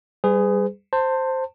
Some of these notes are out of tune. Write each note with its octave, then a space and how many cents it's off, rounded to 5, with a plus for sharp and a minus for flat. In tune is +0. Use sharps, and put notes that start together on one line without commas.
G3 +0 G#4 +0 B4 +40
C5 +0 A5 +25